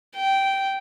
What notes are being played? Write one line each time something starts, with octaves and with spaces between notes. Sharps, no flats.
G5